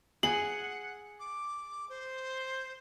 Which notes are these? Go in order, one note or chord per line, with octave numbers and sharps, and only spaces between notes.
G#4 F#5 F#7
D6
C5